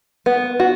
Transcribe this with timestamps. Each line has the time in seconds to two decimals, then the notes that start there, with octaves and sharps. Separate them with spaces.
0.26 B3
0.60 F#4